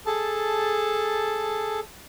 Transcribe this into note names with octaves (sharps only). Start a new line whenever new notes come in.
G#4 A4 A5